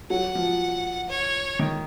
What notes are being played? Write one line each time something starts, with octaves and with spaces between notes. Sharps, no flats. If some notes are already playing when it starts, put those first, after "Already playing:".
F#3 F#5
F3
C#5
D#3